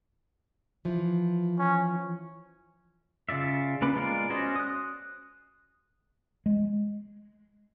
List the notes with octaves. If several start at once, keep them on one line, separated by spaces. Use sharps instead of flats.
E3 F3
C#4
C#3 F4 D5 E5
A#3 C#4 B4 B5 D6
G#3 B3 F4 A#4 D5
C#4 F#4 C5 D5 D#5
D#6 F#6
G#3